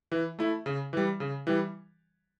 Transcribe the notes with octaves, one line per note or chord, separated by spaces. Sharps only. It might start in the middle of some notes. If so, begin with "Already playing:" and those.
E3
A3 E4
C#3
E3 G3
C#3
E3 G3